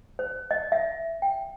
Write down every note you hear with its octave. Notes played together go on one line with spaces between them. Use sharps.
C5
D#5
E5
G5